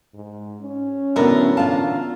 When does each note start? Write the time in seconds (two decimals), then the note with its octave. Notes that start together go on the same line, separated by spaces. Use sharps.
0.14 G#2
0.61 C#4
1.16 F#2 A2 D3 B3 D4 E4 A#4
1.57 E2 D3 F4 F5 A5